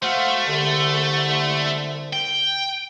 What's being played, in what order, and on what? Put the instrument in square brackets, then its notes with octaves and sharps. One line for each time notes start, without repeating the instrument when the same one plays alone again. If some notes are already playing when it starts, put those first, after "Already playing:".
[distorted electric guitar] A3 [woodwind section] F#4 C5 F5
[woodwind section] C2 D3
[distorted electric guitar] G5